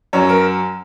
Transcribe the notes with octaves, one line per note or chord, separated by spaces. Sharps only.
F#2 F#3 C#5
A#4